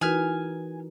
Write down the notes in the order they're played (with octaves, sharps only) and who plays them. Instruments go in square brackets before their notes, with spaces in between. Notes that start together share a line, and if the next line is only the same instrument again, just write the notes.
[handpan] E3 A#4 [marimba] D#4 F#4 B4 [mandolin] G#5 F6